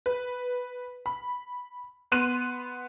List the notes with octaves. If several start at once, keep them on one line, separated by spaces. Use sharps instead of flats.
B4
B5
B3 C6 F#6 D#7